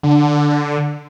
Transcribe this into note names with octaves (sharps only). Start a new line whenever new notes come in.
D3